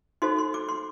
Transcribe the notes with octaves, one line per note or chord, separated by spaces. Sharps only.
D#4 F#4 A4 C5 C6
C6
D6
C6